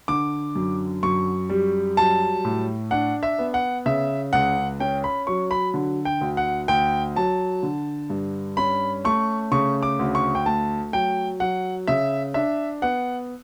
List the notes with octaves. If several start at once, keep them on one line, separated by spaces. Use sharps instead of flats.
D3 D6
F#2
F#2 C#6
G3
F#3 A5
A2
D4 F#5
E5
B3
F#5
C#3 E5
C#2 F#5
C#4 G5
B5
F#3 C#6
B5
D3
G5
D2
F#5
D2 G5
F#3 A5
D3
G2
C#4 B5
A3 C#6
C#3 C#6
D6
D2
C#6
G5
A3 A5
F#3 G5
F#3 F#5
C#3 E5
D4 E5
B3 F#5